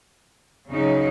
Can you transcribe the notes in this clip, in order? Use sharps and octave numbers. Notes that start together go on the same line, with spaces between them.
C#3 F#3 D#4